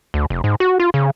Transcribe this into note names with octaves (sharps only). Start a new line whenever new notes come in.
D2
F1
G#2
F#4
F4
C#3